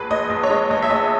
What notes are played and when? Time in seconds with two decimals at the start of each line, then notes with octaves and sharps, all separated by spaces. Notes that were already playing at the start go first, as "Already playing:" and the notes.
Already playing: A#1 G#3 B4
0.10 A#1 D#5
0.30 A#1
0.43 C#5
0.50 G#3 D#5
0.70 A#1 D#5
0.82 E5
0.90 A#1 D#5